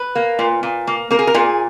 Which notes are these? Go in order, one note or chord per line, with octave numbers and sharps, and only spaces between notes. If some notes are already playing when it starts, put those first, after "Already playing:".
Already playing: B4
A#3
A#2
A#2
A#3
A#3 A#4
G#4
A#4
A#2 G#4